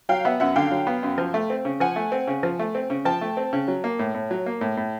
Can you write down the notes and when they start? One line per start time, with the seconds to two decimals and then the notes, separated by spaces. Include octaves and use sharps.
0.09 F#3 F5 G5
0.25 B3 E5 F#5
0.40 F#2 E5 F#5
0.56 D3 F5 G5
0.71 F#3
0.87 B3
1.03 F#2
1.18 F3
1.34 A3
1.50 C4
1.65 C#3
1.80 F3 F#5 G#5
1.96 A3
2.12 C4
2.28 C#3
2.43 F3
2.59 A3
2.75 C4
2.90 C#3
3.05 F3 G5 A5
3.21 A3
3.37 C4
3.53 C#3
3.68 F#3
3.84 A#3
3.99 A2
4.14 A2
4.31 F#3
4.46 A#3
4.61 A2
4.77 A2